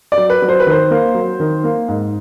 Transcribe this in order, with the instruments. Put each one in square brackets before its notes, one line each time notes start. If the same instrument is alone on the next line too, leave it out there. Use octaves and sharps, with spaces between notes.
[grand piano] D5
F#3
B4
F#3
C5
B4
D#3 C5
A#3
F#3
D#3
A#3
G#2